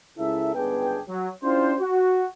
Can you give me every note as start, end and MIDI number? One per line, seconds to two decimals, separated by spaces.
0.18 0.53 37
0.18 0.53 49
0.18 0.53 64
0.18 0.53 69
0.18 0.53 70
0.18 0.53 76
0.55 1.00 31
0.55 1.00 37
0.55 1.00 59
0.55 1.00 62
0.55 1.00 68
0.55 1.00 79
1.08 1.29 54
1.43 1.74 61
1.43 1.74 62
1.43 1.74 64
1.43 1.74 65
1.43 1.74 67
1.43 1.74 72
1.80 2.26 66